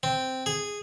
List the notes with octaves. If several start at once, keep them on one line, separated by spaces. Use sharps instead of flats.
C4
G#4